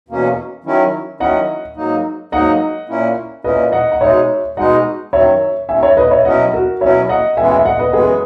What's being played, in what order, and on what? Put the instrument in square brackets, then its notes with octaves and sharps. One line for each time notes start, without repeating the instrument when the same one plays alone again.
[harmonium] E2 B2 A#3 C#4
D#3 F#3 C#4 E4
[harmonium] D#3 F#3 C#4 E4 [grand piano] D#5 F#5
[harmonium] G#2 F#3 A#3 D#4
[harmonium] G#2 F#3 A#3 D#4 [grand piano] D#5 F#5
[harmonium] A#2 A#3 C#4 E4
[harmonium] A#2 A#3 C#4 E4 [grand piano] B4 D#5
[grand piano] D#5 F#5
F#5
[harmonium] B2 G#3 D#4 [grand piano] C#5 E5
[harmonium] B2 G#3 D#4 [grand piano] D#5 F#5
[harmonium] F#2 D#3 F#3 [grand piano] C#5 E5
[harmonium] F#2 D#3 F#3 [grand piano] E5 G#5
[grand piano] C#5 E5
B4 D#5
C#5 E5
[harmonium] B2 F#3 C#4 E4 [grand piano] D#5 F#5
[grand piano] F#4 A#4
[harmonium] B2 F#3 C#4 E4 [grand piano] C#5 E5
[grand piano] D#5 F#5
[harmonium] F#2 E3 G#3 B3 [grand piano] E5 G#5
[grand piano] E5 G#5
D#5 F#5
B4 D#5
[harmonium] F#2 E3 G#3 B3 [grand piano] G#4 B4